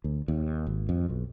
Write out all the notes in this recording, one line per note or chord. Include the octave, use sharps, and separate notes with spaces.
D2
D#2
G#1
F2
B1